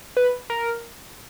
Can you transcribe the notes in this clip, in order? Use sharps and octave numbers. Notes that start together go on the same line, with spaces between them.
B4
A#4